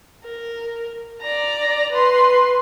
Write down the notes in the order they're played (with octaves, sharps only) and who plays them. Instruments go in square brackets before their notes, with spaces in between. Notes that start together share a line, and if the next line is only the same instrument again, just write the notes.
[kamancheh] A#4
D5 A#5
B4 C6